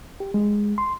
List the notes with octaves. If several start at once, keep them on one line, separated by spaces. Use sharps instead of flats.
G4
G#3
C6